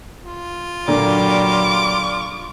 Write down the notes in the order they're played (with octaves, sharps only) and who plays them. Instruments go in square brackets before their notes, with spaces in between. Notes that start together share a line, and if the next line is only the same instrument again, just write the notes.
[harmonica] F4
[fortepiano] A#2 D3 A#3 [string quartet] F#3 G3 [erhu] D6